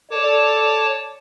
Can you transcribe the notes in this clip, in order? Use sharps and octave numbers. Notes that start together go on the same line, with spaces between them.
A4 C#5 D5 A5 D6